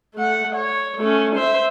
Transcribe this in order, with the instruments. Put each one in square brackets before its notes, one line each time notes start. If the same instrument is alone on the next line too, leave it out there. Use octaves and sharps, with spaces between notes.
[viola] A3 F#5
C#5
A3 C#4
C5 E5